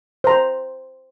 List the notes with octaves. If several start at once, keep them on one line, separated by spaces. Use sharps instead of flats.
C5 A#5